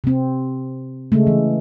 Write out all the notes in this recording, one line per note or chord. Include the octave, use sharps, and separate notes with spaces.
C3 C4
C#3 G#3 A3
E3